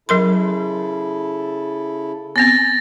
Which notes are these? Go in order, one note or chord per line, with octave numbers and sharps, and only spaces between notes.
C#3 F#3 E4 A4 A#4 C6
B3 C4 A6 A#6